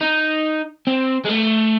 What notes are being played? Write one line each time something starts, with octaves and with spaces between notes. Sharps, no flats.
D#4
C4
G#3
A3